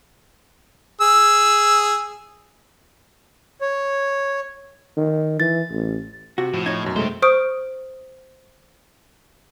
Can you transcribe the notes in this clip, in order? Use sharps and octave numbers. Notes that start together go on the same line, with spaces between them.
G#4 E6
C#5
D#3
E3 A6
A1
C3 F#4
A2 F3
D#4 C#5 G#6
F#2 B2
C3 G#3 A3 C5
C5 C#6 D#6 F6 D7